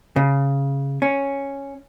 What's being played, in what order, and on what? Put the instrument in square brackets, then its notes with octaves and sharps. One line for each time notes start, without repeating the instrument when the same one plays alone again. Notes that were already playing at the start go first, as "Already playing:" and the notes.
[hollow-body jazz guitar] C#3
C#4